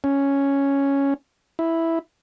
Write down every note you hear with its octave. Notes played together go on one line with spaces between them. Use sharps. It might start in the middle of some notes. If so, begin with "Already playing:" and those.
C#4
E4